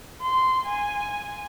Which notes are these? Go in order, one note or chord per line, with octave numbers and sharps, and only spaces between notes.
C6
G#5